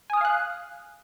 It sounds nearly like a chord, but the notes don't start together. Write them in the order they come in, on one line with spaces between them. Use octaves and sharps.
G#5 D#6 F6 F5 F#6